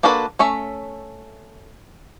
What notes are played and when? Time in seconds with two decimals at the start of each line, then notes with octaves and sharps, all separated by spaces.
0.03 A#3 D4 F#4 A4 B4
0.39 A3 C#4 E5